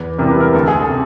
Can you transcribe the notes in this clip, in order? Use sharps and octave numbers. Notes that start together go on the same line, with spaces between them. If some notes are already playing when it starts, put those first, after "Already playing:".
Already playing: E2 B4
C3 E3 G3 A#4
B4
A#4
D2 A4
G#4
A4
C3